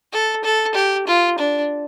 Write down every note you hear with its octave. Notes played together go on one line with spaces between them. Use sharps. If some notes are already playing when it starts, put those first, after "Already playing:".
A4
A4
G4
F4
D4